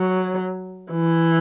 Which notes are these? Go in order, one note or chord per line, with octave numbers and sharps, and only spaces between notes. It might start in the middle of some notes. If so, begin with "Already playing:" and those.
Already playing: F#3
E3